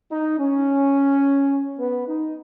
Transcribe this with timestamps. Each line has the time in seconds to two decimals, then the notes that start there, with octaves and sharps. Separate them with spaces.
0.10 D#4
0.38 C#4
1.79 B3
2.08 D#4